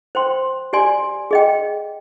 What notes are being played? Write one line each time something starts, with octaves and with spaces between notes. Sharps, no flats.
C5 G5 C6
G4 D5 G#5 C6
G#4 D#5 G5